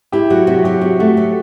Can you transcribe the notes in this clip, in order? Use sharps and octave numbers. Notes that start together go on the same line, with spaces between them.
E4 G4
F#3 F#4
C3 F#4
F#3 G4
C3 F#4
A3 F#4
F#3